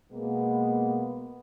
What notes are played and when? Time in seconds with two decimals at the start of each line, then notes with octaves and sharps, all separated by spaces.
0.12 B2 G#3 A#3 B3